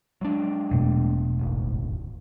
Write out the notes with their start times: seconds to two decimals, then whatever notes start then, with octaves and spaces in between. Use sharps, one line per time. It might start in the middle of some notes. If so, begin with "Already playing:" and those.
0.21 F#3 G#3 D4
0.71 E1 B2 A3
1.39 D1 G#1